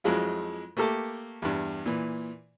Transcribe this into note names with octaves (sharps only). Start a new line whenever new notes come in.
F2 F3 F#3 G#3 E4 F4
A3 A#3 G4 A4
E2 G2
A#2 E3